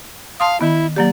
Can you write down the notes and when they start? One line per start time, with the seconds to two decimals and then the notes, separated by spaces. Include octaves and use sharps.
0.40 F5 A5 C6 D#6
0.61 D#3 B3 E4
0.96 F#3 A#3 G4 D5